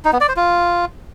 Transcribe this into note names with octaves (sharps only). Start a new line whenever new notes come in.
D#4
B3
D5
C5
F4